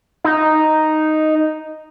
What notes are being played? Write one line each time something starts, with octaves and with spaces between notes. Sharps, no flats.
D#4